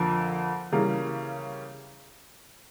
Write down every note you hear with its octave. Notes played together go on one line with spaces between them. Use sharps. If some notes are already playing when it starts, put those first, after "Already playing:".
Already playing: F2 D3 F3 A#3
C#3 E3 G3 A#3